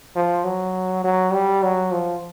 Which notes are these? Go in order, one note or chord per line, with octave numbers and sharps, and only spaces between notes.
F3
F#3
F#3
G3
F#3
F3